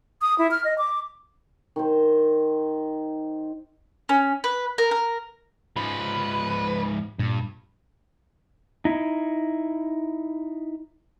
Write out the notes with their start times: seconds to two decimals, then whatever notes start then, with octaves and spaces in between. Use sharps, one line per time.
0.21 D#6
0.38 E4
0.51 F6
0.64 D#5
0.78 D6
1.76 D#3 D#4 C5
4.09 C#4
4.44 B4
4.78 A#4
4.91 A#4
5.77 G#2 F3 B4
7.19 G2 A#2
8.85 D#4 E4